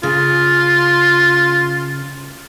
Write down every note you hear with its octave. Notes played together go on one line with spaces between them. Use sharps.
C#3 F4